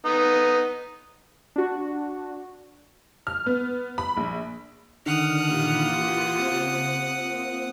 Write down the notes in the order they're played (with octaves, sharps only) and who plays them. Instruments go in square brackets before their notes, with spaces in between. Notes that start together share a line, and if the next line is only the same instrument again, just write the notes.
[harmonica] B3 D#4 D#6
[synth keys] D4 F#4
[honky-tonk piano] F6
B3
B5
A#1
[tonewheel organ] D3 D#3 F6 [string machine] D4 [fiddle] F#5 D#6
[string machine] A#2 E3 B5 [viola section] A#3 F4 G4
[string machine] C#3 [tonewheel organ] C4
[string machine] A#3 F4